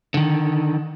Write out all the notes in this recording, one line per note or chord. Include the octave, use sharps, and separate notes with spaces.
D3 D#3